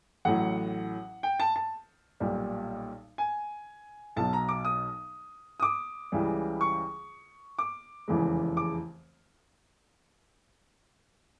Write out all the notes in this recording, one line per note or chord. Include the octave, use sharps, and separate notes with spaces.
A1 A2 F#3 F#5
G5
A5
A5
B1 A#2 G3
G#5
B1 B2 F#3 A5
A#5
D6
D#6
D#6
D6
C#2 C#3 E3 G3
C#6
D6
F1 E2 C#3 E3 G#3
D6